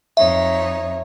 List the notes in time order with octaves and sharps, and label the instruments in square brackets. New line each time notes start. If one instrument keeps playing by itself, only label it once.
[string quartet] F2 D#4 C#5 [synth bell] E5